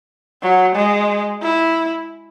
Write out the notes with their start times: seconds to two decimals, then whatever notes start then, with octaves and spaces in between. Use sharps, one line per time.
0.42 F#3
0.75 G#3
1.42 E4